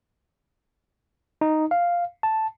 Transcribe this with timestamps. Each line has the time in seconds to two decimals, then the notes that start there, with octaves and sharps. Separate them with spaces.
1.41 D#4
1.71 F5
2.23 A5